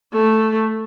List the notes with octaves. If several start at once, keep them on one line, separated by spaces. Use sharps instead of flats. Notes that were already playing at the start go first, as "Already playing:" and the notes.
A3